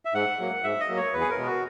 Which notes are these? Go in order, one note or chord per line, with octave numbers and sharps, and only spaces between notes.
E5
G#2 F#5
F#3 A#3
G#2 E5
D#5
F#3 A#3
C#5
E2 B4
G#4
A#4
B2 G#3 B3
F#4